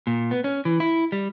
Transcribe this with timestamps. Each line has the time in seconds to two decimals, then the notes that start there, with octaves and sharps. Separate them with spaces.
0.07 A#2
0.31 B3
0.44 C#4
0.65 E3
0.80 E4
1.12 G3